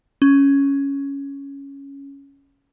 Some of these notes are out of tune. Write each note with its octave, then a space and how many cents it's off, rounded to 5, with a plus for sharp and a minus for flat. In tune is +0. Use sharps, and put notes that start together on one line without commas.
C#4 +5